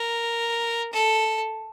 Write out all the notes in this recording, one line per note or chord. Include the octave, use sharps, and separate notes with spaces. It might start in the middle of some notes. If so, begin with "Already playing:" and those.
Already playing: A#4
A4